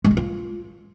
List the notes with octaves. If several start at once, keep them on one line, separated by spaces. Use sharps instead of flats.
G#3
C#4
F4